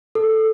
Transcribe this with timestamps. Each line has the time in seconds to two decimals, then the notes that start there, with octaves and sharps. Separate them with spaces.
0.15 A4